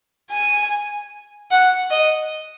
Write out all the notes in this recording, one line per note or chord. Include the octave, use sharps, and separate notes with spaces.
G#5
F#5
D#5